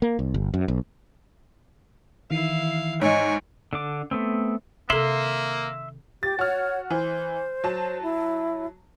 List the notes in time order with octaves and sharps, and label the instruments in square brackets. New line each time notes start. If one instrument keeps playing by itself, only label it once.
[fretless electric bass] A#3
C2
G1
F#2
B1
[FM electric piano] D#3 E3 C7 [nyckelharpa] E4 F5
[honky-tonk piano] G#2 [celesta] C#5 D#5 [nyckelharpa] G#5 C#6
[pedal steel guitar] D3 D4 D6
A3 B3 C4
[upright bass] C3 D#3 [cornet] A#3 [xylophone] A4 F#7 [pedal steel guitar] E5 C6
[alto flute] G4 [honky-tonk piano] A6
[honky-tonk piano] F#4 F6 [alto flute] C#5
[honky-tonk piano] E3 [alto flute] C5
[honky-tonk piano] F#3 A5
[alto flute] E4